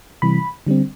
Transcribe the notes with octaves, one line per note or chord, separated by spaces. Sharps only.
C3 E3 G3 B5
D3 G3 C4